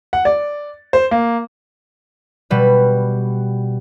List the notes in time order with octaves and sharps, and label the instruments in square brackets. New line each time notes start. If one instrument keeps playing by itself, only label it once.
[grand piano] F#5
D5
C5
A#3
[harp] B2 G3 B4